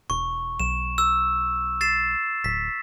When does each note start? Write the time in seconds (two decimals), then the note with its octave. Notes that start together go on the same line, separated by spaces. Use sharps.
0.10 E1 C#6
0.60 B1 E7
0.98 E6
1.81 A6 C7 E7
2.44 D1 B6